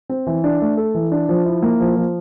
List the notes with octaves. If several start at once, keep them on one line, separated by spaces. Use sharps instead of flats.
C4
E3
D4
A3
A4
E3
D4
F3
E4
A#3
F3
F3